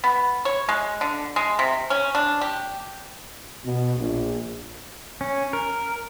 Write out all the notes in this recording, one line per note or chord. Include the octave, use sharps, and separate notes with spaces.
B3
C#5
G#3
D3
G#3
C3
C#4
D4
G4
B2
A#1
C#4
A#4